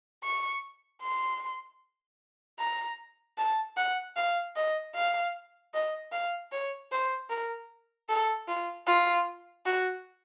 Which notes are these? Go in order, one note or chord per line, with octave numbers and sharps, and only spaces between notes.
C#6
C6
A#5
A5
F#5
F5
D#5
F5
D#5
F5
C#5
C5
A#4
A4
F4
F4
F#4